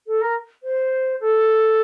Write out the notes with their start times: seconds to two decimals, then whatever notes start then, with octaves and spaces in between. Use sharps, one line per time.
0.07 A4
0.21 A#4
0.63 C5
1.20 A4